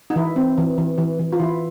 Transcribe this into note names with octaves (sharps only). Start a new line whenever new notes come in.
D#4
E3 E4
C4
E3
E3
E3
E3
F4
E3 E4